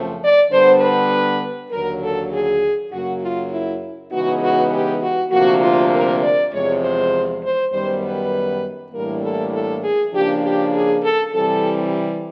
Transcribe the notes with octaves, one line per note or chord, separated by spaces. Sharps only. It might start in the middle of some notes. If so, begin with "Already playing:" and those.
Already playing: F#2 C#3 F3 A3 C4
D5
D3 G3 B3 D4 C5
B4
D#2 D3 F#3 A#4
A4
G#4
F#2 C#3 F#3 A#3 F#4
F4
E4
C#3 E3 G#3 B3 D#4 F#4
F#4
G4
F#4
D2 C3 F3 A#3 F#4
F4
A#4
D5
E2 C3 F3 G#3 C#5
C5
C5
F#2 D#3 G3 B3 C5
B4
A2 E3 G3 A#3 D4 A#4
A4
A4
G#4
C#3 F3 A#3 D4 G4
G4
G#4
A4
C3 E3 G3 C4 A4